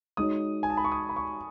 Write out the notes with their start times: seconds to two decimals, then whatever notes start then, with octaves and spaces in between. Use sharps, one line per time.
0.17 G#3 D#4 F#4 C#5 D#6
0.63 G#5
0.70 A5
0.77 B5
0.85 C#6
0.92 D#6
1.09 B5
1.16 C#6